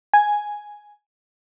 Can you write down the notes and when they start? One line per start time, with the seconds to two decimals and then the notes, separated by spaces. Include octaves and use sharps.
0.14 G#5